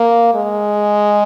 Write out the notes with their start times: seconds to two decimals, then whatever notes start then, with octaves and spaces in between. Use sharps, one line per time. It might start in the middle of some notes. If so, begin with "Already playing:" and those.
Already playing: A#3
0.34 G#3